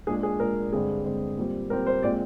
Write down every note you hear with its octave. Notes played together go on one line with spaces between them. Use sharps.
A#2 G#3 D4 G#4
G#4
A#2 G#3 D4 A#4
G2 D3 G#3 C4 G#4
G2 D3 G#3 C4
A#2 G3 C4
A#2 G3 C4 A#4
C5
A#2 G#3 C4 D5